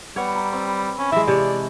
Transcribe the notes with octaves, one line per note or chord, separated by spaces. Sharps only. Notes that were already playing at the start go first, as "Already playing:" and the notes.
G3 B3 C#5 F#5
A#5 E6
C4 B4
C#4 B5
E3 G#3 E5
C3 C#5 D5 A5